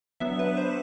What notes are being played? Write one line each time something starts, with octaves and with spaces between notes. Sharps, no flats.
F#3 B3 D4 E5
B4
C5